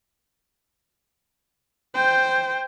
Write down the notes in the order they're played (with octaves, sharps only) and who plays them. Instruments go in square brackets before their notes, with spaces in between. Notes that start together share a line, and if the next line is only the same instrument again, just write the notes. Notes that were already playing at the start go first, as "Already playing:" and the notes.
[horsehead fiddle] C5 G5